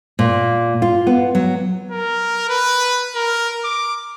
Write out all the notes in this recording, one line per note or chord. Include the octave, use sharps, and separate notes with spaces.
A#2
F4
B3
F#3
A#4
B4
A#4
D6